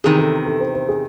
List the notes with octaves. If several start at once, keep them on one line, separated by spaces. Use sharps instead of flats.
E2 C3 D#3 G#4
A4
A4
C5
C5
G#4